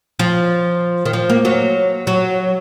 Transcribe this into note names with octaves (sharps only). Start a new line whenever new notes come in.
F3
D#3
F3
A#3
F#3
F#3